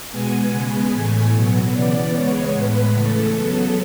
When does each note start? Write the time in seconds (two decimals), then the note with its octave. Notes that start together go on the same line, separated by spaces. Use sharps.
0.11 B2 G#3 B3 G#5
0.51 C#3 G#3 B3
0.92 A2 E3 A3
1.32 B2 F#3 B3
1.72 C#3 E3 B3 D5
2.12 C#3 G#3 B3 C#5
2.53 A2 G#3 B3 B4
2.92 C#3 E3 A3 A4
3.33 C#3 F#3 B3 A4